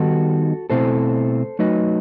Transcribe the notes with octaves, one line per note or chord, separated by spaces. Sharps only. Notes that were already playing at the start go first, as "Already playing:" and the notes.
Already playing: D#3 G3 B3 D#4 F#4 A4
B2 A3 C4 E4 A4 C5
F#3 A3 D#4 B4 D#5